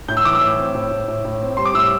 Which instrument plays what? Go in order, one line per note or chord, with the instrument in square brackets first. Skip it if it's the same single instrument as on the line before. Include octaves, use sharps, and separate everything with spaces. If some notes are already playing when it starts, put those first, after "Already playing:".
[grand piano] A2 G6
E6
E3 D6
E6
A2
C4
A2
A2
A2
A2
C4
G3 C6
D6
A2 E6